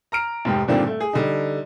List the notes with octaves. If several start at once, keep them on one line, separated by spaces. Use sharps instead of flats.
A#5 F6 D7
F1 G#2 G4
G2 A#2 D3 D#3 C4 D4
A3
G#4
D3 G3 D#4